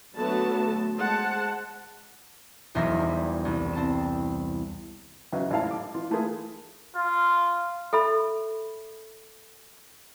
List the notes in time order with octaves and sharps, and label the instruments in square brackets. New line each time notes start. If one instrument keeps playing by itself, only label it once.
[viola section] D3 F#3 A3 B3 F#4 A5
G#3 C5 F#5 A5
[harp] E1 B1 E2 C5 E5 A#6
G3
C2
C4 A5 E7
[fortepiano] E2 C#3 F#3 D#4
A1 G#2 E4 F5 A5
D6
E3 F4
E3 A3 A#3 E4 F4 G#4
[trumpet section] F4
[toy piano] A4 E5 B5